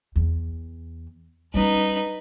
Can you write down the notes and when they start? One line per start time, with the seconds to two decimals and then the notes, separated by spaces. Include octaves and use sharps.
0.16 E2
1.54 G3 C#4 D#4 B4